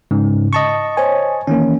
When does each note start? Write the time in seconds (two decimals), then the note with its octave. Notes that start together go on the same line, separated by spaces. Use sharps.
0.11 G#2 C#3
0.53 D#5 A5 C#6
0.97 C5 C#5 G#5
1.47 D#3 E3 A#3 C#4